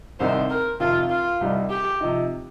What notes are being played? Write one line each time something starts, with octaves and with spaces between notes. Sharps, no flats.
C2 C3 D#3 C4 D#4 C5
A#4
F2 C3 D#3 F4
F4
C2 C3 G3 D#4
G4
C3 F3 D#4